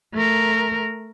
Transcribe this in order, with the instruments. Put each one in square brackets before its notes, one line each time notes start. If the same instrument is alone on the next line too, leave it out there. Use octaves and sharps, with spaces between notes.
[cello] A3 A#4